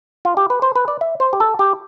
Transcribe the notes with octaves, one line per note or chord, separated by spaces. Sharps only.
F4
G4
B4
C5
B4
D5
E5
C5
G4
A4
G4